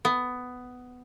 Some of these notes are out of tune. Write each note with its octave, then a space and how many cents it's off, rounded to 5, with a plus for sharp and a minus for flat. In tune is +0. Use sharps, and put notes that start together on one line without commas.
B3 +10